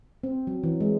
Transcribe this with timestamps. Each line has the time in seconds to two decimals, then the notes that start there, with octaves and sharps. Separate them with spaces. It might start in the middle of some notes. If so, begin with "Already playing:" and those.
0.23 C4
0.47 F#3
0.64 E3
0.80 G#3